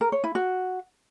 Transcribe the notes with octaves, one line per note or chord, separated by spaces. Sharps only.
A#4
C#5
E4
F#4